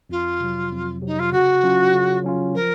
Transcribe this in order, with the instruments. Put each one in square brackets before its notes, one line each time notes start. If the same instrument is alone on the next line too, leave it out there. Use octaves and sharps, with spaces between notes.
[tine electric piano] F2 [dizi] F4
[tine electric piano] C3 F#3
F2
[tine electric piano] C3 F#3 [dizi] D#4
[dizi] F4
[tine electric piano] C#3 [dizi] F#4
[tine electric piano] F#3 C#4 F4
C#3
F#3 C#4 F4
[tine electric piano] F3 [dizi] A#4